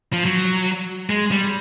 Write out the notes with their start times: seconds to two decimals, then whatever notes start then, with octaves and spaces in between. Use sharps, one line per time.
0.13 F3
0.25 F#3
1.10 G#3
1.31 G3